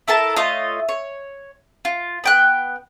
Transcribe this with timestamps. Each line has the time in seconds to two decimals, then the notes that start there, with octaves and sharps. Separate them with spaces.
0.08 E4 A4 A#4 A5
0.36 A3 F4 C#5 D#5
0.89 C#5
1.85 F4
2.24 B3 G5 F#6